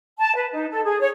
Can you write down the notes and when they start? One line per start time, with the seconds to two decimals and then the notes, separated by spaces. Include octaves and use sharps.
0.19 A5
0.35 B4
0.53 D#4
0.71 A4
0.84 G#4
1.00 C#5